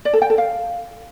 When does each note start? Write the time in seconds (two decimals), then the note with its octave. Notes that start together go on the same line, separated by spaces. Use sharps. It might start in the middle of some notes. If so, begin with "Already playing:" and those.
0.05 D5
0.13 A4
0.22 G5
0.30 A4
0.38 F5